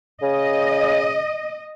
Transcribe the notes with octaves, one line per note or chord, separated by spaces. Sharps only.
C#3 D#5